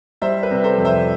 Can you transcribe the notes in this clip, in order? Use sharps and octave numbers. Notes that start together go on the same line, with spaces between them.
G3 C5 E5
B4
C3
A4 C5
F2
C5 E5